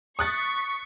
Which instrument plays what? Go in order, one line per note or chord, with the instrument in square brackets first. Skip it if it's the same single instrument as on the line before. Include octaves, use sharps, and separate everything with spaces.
[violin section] C#6 B6 [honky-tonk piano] D#6 F#6 A6